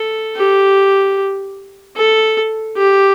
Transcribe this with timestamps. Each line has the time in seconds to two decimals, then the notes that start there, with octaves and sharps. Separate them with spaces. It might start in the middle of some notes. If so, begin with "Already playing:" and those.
Already playing: A4
0.36 G4
1.97 A4
2.77 G4